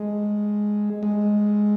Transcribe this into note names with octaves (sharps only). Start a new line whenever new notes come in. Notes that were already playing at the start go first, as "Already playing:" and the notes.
Already playing: G#3
G#3